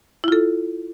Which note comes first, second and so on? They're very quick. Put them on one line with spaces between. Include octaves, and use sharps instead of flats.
E4 F4 A4